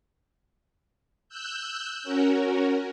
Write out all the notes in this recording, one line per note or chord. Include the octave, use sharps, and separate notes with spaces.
E6 F#6 G6
C#4 F#4 A#4